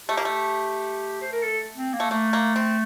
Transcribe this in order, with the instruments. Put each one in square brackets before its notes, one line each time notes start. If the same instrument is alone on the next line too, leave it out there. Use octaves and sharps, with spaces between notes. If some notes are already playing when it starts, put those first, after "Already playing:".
[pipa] A3 [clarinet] G4
[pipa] A#3
A3
[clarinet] C5
A#4
A4
C4
A#3
[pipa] A3
[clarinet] A3 [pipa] A#3
[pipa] A#3
C4